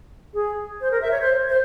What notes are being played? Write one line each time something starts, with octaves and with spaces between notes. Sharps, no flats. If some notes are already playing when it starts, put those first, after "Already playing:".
G#4
C5
A#4
E5
C#5
C5
C5